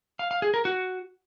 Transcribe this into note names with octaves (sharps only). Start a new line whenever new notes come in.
F5
F5
G#4
A#4
F#4